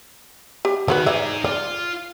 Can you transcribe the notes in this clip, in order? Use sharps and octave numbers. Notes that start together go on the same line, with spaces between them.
G4
D#3 F3 F#4 B4
D#4 G#4 C#5 D5 E5
F4 D5